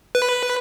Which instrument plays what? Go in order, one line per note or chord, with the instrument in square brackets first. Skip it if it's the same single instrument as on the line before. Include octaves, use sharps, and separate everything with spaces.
[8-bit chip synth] B4